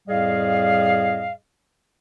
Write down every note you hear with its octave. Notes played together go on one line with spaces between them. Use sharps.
F2 A2 G3 G#4 D#5 F5